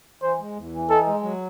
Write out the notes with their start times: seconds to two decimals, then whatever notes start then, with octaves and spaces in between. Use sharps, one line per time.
0.21 E3 C5
0.40 G#3
0.56 E2
0.73 E3
0.89 D#4 A4
1.06 G#3
1.23 F#3